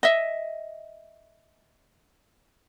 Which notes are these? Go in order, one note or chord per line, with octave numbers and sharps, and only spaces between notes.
D#5 E5